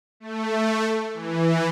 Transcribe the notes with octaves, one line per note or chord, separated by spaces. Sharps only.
A3
E3